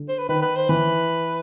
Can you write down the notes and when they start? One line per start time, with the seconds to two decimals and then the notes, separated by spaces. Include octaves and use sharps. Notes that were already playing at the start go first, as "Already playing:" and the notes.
Already playing: D3
0.09 C5
0.18 B4
0.29 D#3 B4
0.42 B4
0.56 C5
0.69 E3 B4